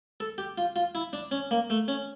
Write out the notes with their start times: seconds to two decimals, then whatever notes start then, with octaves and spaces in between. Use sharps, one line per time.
0.20 A4
0.38 G4
0.58 F4
0.76 F4
0.95 E4
1.13 D4
1.31 C#4
1.51 A#3
1.70 A3
1.88 C#4